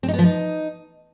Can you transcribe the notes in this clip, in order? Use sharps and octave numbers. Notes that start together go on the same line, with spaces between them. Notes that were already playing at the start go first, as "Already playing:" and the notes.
C4
D#4
B3
F3
D#4